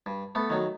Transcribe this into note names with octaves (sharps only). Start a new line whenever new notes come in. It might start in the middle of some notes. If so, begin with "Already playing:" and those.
G2
A3 B3
D#3 F#3